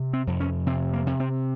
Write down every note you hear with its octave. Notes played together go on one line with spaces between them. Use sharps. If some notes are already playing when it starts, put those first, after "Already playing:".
Already playing: C3
C4
F2
C#4
C3 C4
A#3
C3
C4